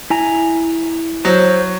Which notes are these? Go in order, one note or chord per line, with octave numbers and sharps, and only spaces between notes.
E4 G#5 A#5
F#3 C5